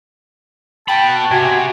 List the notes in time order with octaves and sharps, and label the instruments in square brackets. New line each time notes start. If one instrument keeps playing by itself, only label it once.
[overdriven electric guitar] F#4 B5 [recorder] G5 [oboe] A5
[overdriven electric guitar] C3 [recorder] F#4 [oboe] G#5